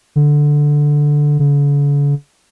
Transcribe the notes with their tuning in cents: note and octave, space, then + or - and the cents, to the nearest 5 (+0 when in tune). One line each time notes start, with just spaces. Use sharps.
D3 +0
D3 -45